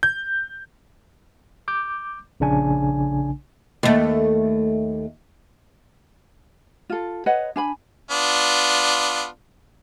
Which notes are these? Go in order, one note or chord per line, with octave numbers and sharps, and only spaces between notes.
G6
D6 G6
A#1 C#3 D4 G#5
D#2 A3
F4 A4
B4 C#5 D#5 F#5
D4 G#5 B5
B3 D4 F4